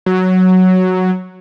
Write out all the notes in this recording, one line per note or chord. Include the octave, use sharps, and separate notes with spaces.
F#3